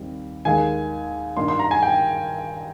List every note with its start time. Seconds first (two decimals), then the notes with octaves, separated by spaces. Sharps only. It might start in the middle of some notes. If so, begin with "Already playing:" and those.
Already playing: D#2 D#3 G3 C4
0.45 D#2 D#3 G#3 G#5
1.37 G2 D#3 A#3 D4 C6
1.48 C6
1.59 A#5
1.71 G#5
1.83 G5